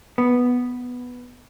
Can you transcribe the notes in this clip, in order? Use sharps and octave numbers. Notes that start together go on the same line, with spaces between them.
B3